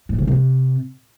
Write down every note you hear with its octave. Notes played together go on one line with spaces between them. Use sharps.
A2
C#3
C3